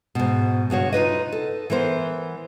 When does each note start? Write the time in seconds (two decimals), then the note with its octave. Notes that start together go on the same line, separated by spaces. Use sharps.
0.15 G#2 B2
0.70 G2 C#3 F#4 C#5
0.93 D#4 F4 B4 D#5
1.32 A4
1.70 E3 B3 A#4 C5